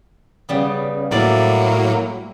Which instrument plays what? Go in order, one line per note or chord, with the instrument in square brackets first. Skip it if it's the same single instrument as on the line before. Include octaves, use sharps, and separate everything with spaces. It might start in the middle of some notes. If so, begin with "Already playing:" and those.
[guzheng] C#3 G3 B3
[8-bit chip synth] A2 F#3 A#3 [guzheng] E4 D5